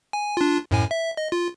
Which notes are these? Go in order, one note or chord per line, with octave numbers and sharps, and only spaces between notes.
G#5
D4 F4
F#2 A2 G#5
E5
D#5
F4